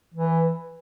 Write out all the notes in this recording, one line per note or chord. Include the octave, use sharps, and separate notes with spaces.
E3